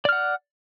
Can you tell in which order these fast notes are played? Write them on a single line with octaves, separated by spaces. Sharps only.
D5 F6 F#5